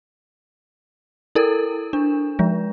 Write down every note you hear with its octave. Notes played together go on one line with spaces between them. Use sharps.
E4 A4 A#4
D4
F3 G#3